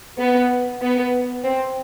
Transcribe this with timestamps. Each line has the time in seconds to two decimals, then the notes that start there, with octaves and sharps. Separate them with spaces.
0.19 B3
0.82 B3
1.44 C4